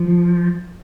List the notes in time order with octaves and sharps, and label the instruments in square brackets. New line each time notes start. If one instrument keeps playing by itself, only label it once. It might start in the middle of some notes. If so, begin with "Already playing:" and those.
Already playing: [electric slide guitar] F3